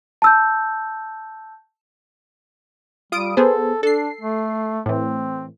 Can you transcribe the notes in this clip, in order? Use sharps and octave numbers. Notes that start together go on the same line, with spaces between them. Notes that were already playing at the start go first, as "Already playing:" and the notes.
A5 E6 G6
G3 F4 D#6 D7
B3 G#4 A4 C5
D4 A4 C7
A3
A2 E3 C4